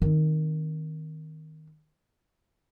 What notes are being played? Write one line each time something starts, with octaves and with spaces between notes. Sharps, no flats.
D#3 C4